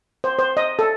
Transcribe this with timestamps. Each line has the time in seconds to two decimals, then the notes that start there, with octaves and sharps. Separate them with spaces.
0.24 C5
0.39 C5
0.57 D#5
0.79 A4